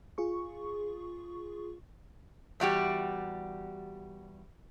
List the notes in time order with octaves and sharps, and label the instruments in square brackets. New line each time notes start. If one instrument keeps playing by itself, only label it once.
[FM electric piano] F4 G#4 C#6
[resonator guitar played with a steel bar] E2 G3 F#4 G4